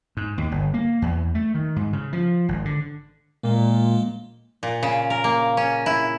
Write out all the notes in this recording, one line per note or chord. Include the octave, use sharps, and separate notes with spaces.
G#2
D#2
G1
A#3
E2
A3
D#3
G#2
C#3
F3
G#1
D3
A#2 G#3 A#3
A#2
C#3
A#4
A#3
C#4
E4